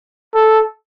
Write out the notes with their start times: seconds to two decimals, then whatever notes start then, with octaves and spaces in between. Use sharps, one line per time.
0.35 A4